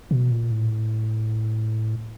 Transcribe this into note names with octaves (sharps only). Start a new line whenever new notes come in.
B2
A#2
A2